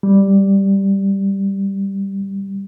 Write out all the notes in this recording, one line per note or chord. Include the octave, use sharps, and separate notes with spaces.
G3